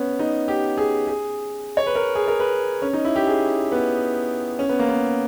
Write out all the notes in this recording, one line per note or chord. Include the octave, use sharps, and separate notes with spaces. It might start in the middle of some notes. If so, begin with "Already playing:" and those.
Already playing: B3 C#4
D#4
G4
G#4
G#4
C#5
B4
A#4
G#4
A#4
B4
C#4
D#4
E4
G4
G#4
B3
C#4
B3
A#3
B3